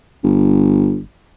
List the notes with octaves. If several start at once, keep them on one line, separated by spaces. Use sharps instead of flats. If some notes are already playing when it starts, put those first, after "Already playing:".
G1